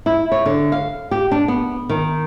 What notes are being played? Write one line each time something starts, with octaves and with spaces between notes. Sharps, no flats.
E4
C#5
D3
F5
G4
D4
B3
D#3